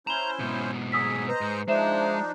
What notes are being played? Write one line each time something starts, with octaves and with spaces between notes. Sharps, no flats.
C#4 E4 C5 A#5 E7 G7
G#2 B2
F#3 G#4 D#6 E6 B6
B4 C5 D#5 A#5
G#2
F3 G#3 D4 D#4 C5 E5 E7